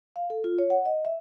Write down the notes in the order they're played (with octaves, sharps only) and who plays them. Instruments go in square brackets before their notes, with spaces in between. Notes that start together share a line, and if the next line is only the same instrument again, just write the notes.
[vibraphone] F5
A4
F4
C#5
F#5
D#5
E5